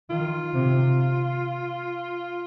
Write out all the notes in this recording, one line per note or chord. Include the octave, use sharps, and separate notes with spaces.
D#3 F4
C3